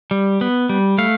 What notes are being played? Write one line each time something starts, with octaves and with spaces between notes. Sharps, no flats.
G3
B3
G3
A3 F5